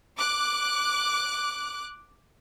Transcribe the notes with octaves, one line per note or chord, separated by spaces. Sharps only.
D6 F#6